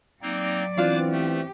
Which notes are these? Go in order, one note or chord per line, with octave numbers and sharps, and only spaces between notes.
F#3 A#3 C4 D#4 D5
E3 B3 C4 D4 F4 B4 C5 D6
A3 G4